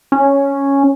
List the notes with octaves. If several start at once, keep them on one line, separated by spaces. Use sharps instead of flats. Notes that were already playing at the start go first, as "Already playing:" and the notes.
C#4